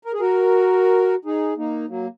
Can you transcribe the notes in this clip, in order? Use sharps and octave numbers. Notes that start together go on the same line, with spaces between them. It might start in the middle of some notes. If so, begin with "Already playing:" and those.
A#4
G#4
F#4 A#4
D#4 G#4
A#3 D#4
F#3 A#3